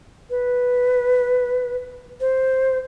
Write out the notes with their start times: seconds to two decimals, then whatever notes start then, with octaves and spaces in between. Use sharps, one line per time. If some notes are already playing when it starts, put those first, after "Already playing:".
0.30 B4
2.21 C5